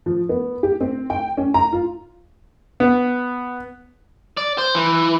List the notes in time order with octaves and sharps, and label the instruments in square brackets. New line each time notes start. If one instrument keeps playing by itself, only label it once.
[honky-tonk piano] F3
B3
G4
C4
G5
C#4
A#5
F4
[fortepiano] B3
[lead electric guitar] D5
C5
E3